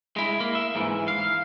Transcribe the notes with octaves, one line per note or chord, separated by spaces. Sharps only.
G#3 E4
A#3
E5
G#2 E3
F5